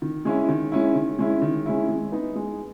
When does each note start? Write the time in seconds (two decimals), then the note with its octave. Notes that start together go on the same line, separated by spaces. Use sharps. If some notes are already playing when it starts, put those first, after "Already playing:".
0.02 D#3
0.25 G#3 C#4 E4
0.49 D#3
0.72 G#3 C#4 E4
0.95 D#3
1.19 G#3 C#4 E4
1.42 D#3
1.66 G#3 C#4 E4
1.89 G#3
2.12 B3 D#4
2.36 G#3